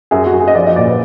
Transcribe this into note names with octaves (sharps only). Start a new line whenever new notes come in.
F#2 G#4
F#4
F#2
G#4
D#5
F3 D5
D#5
A#2 D5
B4